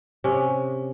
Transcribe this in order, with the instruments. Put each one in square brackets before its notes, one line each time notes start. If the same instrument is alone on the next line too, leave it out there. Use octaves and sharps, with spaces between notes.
[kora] C3 C#4